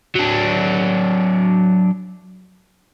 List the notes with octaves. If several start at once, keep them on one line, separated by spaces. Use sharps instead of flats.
F#3 D4